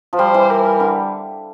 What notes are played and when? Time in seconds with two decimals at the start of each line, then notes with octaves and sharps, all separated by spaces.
0.13 F3
0.18 G3 C5
0.34 E3
0.50 A#4
0.80 D3